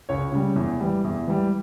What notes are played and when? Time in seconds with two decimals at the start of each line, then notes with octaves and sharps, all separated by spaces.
0.09 C#2 C#5
0.32 C#3 G3
0.56 E2
0.80 E3 G3
1.04 E2
1.27 E3 G3